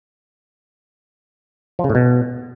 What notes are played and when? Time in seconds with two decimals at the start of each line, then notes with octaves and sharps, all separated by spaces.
1.79 F3
1.84 C#3
1.90 A2
1.95 B2